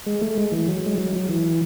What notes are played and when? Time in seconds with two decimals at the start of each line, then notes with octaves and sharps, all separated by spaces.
0.06 G#3
0.22 A3
0.38 G#3
0.52 E3
0.68 F#3
0.86 G#3
0.98 F#3
1.17 F#3
1.29 E3